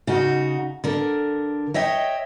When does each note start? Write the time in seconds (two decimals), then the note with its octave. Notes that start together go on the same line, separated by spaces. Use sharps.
0.07 C#3 D#4 F#4
0.84 D3 A#4
1.74 C#5 D#5 E5 G5